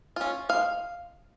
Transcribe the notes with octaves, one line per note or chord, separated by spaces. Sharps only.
C#4 F4
G#3 F5